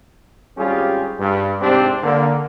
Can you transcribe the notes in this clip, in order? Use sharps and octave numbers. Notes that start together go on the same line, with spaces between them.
G#1 G3 C#4 F4 G4 G#4
G2
C2 G#2 C4 D4 G4
D3 A#3